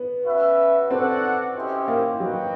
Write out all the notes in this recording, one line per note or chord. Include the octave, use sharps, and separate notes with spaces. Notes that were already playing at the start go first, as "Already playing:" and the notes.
Already playing: B3
C#4 F#4 B4 E5
C4 F#4 A4 D5 F#5
C#4 E4 G4 C5 D#5
A#3
F#3 F#4 B4 D#5 G5